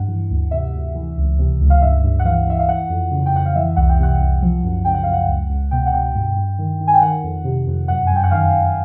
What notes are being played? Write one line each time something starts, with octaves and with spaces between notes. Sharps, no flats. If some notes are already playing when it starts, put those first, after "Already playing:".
Already playing: G2 F#5
E3
D2
C3 E5
D2
E3
C#2
C3
C#2
F5
G2 E5
G2
F#5
E3 F5
E3 E5
F5
E3 F#5
F2
C#3
G5
F2 F#5
F5
E3 E5
C2 F#5
G5
C3 F#5
C2
F3
F#2
C#3 G5
F#5
F#2 F5
F#5
C#2
C#2
B2 G5
F#5
B2 G5
G2
G2
D#3
D#3
G#5
G5
D#3 F#5
F2
C3
F2
F#2 F#5
F#2 G#5
G5
F#5
D#3 F5
D#3